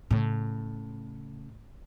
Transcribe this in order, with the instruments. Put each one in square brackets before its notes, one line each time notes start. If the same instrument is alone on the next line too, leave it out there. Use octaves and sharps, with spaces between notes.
[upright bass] A2 C#3